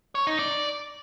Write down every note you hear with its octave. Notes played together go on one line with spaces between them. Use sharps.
C#5
D#4
D5